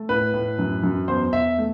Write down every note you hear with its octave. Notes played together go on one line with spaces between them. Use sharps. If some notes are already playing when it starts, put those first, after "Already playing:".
Already playing: A3
A2 B4
A2
F#2
F#2
E2 C5
E2 E5
A3